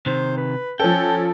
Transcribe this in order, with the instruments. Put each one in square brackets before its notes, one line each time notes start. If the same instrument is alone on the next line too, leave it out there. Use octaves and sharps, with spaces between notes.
[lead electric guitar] C3 D#3 [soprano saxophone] C5
[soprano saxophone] B4
[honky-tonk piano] F3 A4 [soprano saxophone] C#4 [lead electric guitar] G5